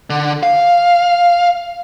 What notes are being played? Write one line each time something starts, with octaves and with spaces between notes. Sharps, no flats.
D3
F5